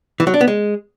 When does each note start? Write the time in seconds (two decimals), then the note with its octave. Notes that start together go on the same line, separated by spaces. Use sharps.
0.20 E3
0.27 F#3
0.34 D4
0.41 B3
0.48 G#3